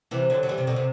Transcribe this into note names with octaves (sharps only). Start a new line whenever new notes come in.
C3 E3
D3 F#3
F#3
E3 G3
C3
B2 D3
C3